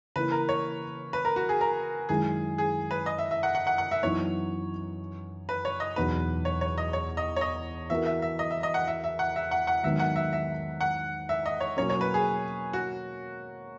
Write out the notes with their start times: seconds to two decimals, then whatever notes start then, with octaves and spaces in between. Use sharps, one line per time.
0.15 C#3 E3 A#3 E4 B4
0.31 A#4
0.49 C#5
1.13 B4
1.25 A#4
1.36 F#4
1.49 G#4
1.61 A#4
2.09 F#2 D#3 G#3 C#4 E4 G#4
2.58 G#4
2.91 B4
3.06 D#5
3.19 E5
3.31 E5
3.43 F#5
3.55 F#5
3.67 F#5
3.78 F#5
3.91 E5
4.03 F#2 E3 B3 D#4 C#5
5.49 B4
5.65 C#5
5.80 D#5
5.96 E2 B2 F#3 B3 D#4 B4
6.45 C#5
6.61 C#5
6.78 D#5
6.93 C#5
7.17 D#5
7.36 C#5
7.41 D#5
7.90 E3 B3 F#4 A#4 E5
8.06 E5
8.22 E5
8.39 D#5
8.51 E5
8.63 D#5
8.74 F#5
8.87 E5
9.04 E5
9.19 F#5
9.36 E5
9.51 F#5
9.67 F#5
9.83 G#2 D#3 F#3 B3 E5
9.99 F#5
10.16 E5
10.33 E5
10.81 F#5
11.29 E5
11.46 D#5
11.61 C#5
11.77 B2 F#3 A#3 C#4 C#5
11.90 C#5
12.01 B4
12.14 G#4
12.73 F#4